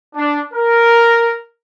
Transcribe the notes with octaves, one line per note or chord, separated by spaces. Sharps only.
D4
A#4